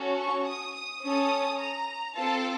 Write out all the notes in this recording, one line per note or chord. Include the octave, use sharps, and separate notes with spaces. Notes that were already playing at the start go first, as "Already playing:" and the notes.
Already playing: C#4 F#4 A4
C#6
D#6
D#6
C#4 A4 D#6
A#5
C4 F4 A4 A5